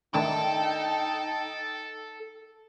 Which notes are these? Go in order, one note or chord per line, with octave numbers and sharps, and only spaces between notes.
D#3 A3 D4 D#4 A4 G5 A5